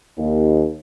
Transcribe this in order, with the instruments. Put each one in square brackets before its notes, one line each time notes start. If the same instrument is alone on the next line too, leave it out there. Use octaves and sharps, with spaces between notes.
[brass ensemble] D#2